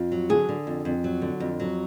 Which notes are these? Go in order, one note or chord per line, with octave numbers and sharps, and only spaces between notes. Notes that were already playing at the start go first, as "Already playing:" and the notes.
Already playing: F2 F4
F#3
D3 G#4
D3
F2
F2
F#3
D3
F2
F#3